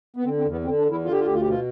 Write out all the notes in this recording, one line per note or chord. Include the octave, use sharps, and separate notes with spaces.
B3
D3 C4
C4
E2
B3
D3 C4
D4
E2
E4
D3 F4
G4
F4
D2 G4
F4
G4
B2 F4